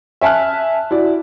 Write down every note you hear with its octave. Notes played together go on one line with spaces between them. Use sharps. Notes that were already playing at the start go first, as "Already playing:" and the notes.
E5 G#5 A5 F6 F#6
E4 F#4 D5